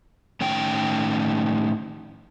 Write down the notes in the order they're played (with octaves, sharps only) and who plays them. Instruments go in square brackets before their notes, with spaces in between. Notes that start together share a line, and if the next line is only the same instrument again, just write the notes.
[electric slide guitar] A2 D#3 C#4 G5